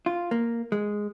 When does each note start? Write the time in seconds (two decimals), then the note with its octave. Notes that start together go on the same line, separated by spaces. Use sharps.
0.06 F4
0.31 A#3
0.72 G#3